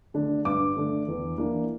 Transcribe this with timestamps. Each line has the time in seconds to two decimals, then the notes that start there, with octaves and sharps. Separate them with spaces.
0.14 D3 A3 D4
0.45 G2 D6
0.76 D3 A3 D4
1.08 E2
1.38 E3 A#3 D4